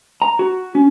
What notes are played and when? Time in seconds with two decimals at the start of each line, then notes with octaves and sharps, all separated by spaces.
0.22 A#5
0.39 F#4
0.75 C#4